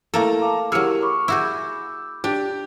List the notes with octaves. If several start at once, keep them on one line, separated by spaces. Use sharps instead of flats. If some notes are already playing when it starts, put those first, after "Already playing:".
A3 A#3 E4 A4 A#5
F5 A5 D6
F#3 E4 G4 G#4 A#4 E6 F6 C#7
B5 C#6 D6
E4 F#4 G#4 B5 D6 E6 G6
D4 G4